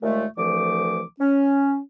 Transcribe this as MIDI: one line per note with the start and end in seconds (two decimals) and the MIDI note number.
0.02 0.26 39
0.02 0.26 46
0.02 0.26 56
0.02 0.26 57
0.37 1.02 36
0.37 1.02 50
0.37 1.02 52
0.37 1.02 53
0.37 1.02 57
0.37 1.02 86
1.20 1.78 61